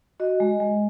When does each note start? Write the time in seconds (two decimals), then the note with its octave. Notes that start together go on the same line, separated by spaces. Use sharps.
0.20 F#4 D#5
0.40 G#3
0.60 G#3